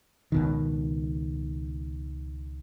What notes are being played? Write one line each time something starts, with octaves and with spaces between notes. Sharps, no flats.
C#2 B2 D#3